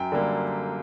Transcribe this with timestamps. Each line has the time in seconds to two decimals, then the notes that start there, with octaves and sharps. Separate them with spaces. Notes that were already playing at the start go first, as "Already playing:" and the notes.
Already playing: F#2 G5
0.12 D3 G3 A#3